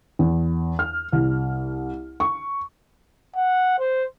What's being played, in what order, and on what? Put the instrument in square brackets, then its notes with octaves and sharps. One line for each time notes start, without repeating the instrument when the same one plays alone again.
[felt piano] E2
F6
C2
C#6
[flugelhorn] F#5
C5